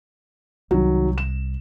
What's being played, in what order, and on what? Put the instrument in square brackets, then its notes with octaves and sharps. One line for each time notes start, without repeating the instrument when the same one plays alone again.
[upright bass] C2 [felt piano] D#3 F#3
[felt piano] E7